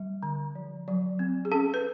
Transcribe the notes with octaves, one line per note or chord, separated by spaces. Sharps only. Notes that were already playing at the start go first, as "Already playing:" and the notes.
Already playing: G3
D3
F3
F#3
C4
G#4
C#4 A4
B4